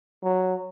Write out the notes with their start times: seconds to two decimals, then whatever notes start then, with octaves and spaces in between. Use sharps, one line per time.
0.23 F#3